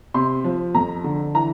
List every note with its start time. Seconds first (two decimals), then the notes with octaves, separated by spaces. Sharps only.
0.14 C3 C6
0.44 F3
0.74 F2 A#5
1.04 D3
1.34 E3 A#5